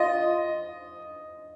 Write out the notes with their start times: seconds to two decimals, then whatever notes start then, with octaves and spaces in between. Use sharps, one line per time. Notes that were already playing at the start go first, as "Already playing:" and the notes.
Already playing: F4 D#5